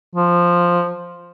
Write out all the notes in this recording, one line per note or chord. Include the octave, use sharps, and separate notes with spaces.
F3